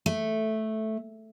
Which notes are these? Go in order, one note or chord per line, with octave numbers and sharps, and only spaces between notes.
A3